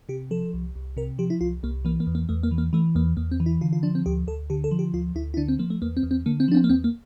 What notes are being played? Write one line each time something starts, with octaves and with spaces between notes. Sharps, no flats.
C3 G4
F3 A4
C2
C2
C3 A#4
F3 G4
E4
C2 F4
C2 A#3
E3 A#3
A#3
E2
A#3
E2 A3
A#3
E3
A#3
E3 A3
E2 A#3
E2 A#3
C4
E3
E4
D3 F4
F4
F3 D4
C4
D2 G4
D2 A4
D3 G4
A4
F3
G4
D2 F4
D2 E4
E4
D3 D4
C4
F3 A#3
A3
E2 A#3
C4
E2
C4
D3 A#3
C4
F3 D4
C4
A#3
E2 C4
A#3